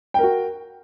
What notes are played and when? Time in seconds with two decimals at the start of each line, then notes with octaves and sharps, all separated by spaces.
0.14 G5
0.19 A#4
0.23 F#4